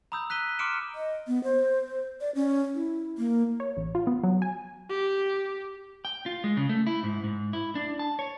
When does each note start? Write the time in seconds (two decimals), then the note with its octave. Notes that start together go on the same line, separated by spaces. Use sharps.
0.12 A#5 B5 D#6 E6 G6
0.30 F#6 B6 D#7 G7
0.59 C6 D6 F6 C#7 D7 E7
0.95 D#5
1.28 B3
1.44 C5
2.21 D5
2.35 C#4
2.75 E4
3.18 A#3
3.60 C#5
3.77 A1
3.95 F4
4.07 B3
4.23 F#3
4.42 G#5
4.90 G4
6.05 G5
6.26 F4
6.44 G#3
6.57 C#3
6.69 A3
6.87 E4
7.03 G#2
7.24 G#2
7.53 E4
7.75 D4
7.99 A5
8.19 C#5